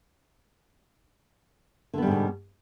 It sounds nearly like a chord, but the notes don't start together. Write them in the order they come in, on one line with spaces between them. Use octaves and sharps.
D3 B3 G3 G#2 B2